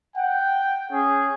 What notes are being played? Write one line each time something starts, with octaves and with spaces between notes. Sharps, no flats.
F#5 G5
C#4 G#4